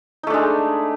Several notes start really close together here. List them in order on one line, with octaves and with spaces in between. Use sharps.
D#4 A3 D4 G#3